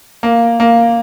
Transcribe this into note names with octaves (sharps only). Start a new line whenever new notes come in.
A#3
A#3